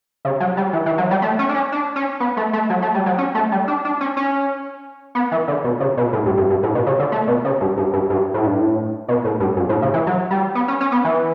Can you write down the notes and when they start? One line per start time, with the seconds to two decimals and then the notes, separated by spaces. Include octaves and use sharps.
0.25 C#3
0.40 F#3
0.57 G3
0.73 E3
0.86 E3
0.98 F#3
1.11 G3
1.22 A3
1.39 C#4
1.49 D4
1.55 C#4
1.72 D4
1.96 C#4
2.20 B3
2.37 A3
2.53 A3
2.70 F#3
2.82 A3
2.94 G3
3.06 F#3
3.18 C#4
3.35 A3
3.52 G3
3.68 D4
3.85 D4
4.01 C#4
4.17 C#4
5.15 B3
5.32 E3
5.48 D3
5.64 B2
5.80 C#3
5.97 B2
6.13 A2
6.26 G2
6.37 G2
6.50 G2
6.63 A2
6.75 B2
6.86 C#3
6.99 D3
7.12 A3
7.27 B2
7.45 C#3
7.61 G2
7.77 G2
7.93 G2
8.10 G2
8.34 A2
8.47 G2
8.60 A2
9.08 B2
9.25 A2
9.40 G2
9.57 F#2
9.69 A2
9.82 C#3
9.94 E3
10.07 F#3
10.31 G3
10.55 B3
10.68 C#4
10.80 C#4
10.92 B3
11.04 E3